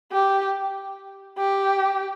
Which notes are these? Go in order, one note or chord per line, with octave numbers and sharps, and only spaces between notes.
G4
G4